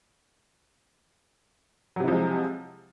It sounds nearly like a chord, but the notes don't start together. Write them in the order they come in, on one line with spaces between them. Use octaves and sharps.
F#3 C3 E4 F3 G#3